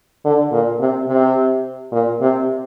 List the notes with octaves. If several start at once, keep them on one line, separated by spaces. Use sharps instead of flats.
D3
A#2
C3
C3
A#2
C3